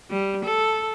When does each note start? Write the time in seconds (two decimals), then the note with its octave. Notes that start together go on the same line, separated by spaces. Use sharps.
0.10 G3
0.45 A4